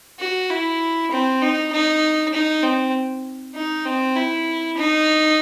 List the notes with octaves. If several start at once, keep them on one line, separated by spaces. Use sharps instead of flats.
F#4
E4
C4
D#4
D#4
D#4
C4
D#4
C4
E4
D#4